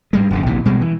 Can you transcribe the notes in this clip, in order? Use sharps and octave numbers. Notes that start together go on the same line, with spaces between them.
G#2 G3 G#3
D#1 F#2 D3
A#1 D#2 C3 E3
B2 G3 G#3
E3